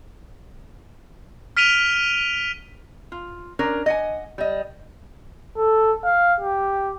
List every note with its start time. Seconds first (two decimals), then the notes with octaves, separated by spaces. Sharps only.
1.57 F6 B6 D7 D#7 F7 G7
3.12 F4
3.59 C#4 D4 A#4
3.86 D#5 F#5 G#5
4.38 G3 D#5
5.57 A4
6.04 F5
6.40 G4